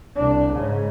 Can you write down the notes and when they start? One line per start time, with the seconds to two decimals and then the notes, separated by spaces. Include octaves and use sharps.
0.16 C2 D4
0.53 G#2 C#3